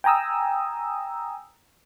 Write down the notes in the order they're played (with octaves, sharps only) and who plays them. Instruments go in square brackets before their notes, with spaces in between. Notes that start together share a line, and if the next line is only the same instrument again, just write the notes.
[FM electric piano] G5 G#5 A#5 D#6 E6